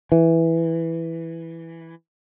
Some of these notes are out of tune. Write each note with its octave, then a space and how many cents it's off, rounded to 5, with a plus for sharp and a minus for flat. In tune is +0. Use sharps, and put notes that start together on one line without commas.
E3 +0